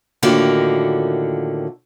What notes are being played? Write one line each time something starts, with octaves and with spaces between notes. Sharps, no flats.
A2 D3 D#3 F3 A#3 F#4